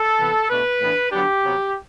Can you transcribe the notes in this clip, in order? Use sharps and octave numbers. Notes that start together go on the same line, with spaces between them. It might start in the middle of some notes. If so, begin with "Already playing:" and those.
Already playing: A4
C3 E3 B3
B2 A3 D4 B4
A2 E3 B3 D4
D3 F#3 B3 D4 G4
C3 F#3 B3